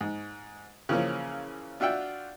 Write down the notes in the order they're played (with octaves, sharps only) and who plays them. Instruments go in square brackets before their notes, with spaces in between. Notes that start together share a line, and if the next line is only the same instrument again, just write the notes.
[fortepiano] G#2
C#3 E3 F3 A#3 C#4
D4 F4 F#4 E5 G5